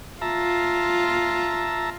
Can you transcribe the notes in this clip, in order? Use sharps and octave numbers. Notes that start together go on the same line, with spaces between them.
F4 E5 A5 A#5